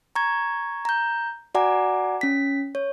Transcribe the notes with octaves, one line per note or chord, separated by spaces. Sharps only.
A#5 C#6 G#6
A#5 G6
F#4 D5 F#5 G#5 A#5 D6
C#4 B6
C#5